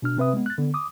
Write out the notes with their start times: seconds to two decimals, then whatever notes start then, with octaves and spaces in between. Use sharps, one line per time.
0.02 B2 D4 F6
0.17 C3 C4 B4 E5 D#6
0.33 G#3 B3
0.46 F#6 A6
0.58 D3 B3
0.74 D6 D#6